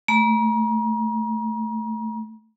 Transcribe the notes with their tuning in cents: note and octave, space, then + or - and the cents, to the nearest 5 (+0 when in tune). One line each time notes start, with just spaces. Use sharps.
A3 +0 A#5 +35